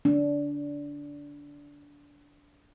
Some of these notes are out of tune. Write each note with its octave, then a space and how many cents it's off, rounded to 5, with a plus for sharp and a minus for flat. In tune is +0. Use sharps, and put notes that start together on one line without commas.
D4 -20